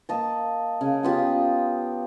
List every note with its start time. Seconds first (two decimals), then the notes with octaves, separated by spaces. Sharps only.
0.09 A#3 D#5 A5
0.81 C#3
1.03 B3 F4 G4